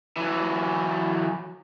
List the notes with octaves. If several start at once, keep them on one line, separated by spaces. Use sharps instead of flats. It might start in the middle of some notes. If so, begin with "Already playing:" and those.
E3 F#3